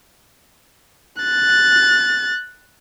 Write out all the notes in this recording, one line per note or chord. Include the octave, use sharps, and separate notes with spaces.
F#6 A6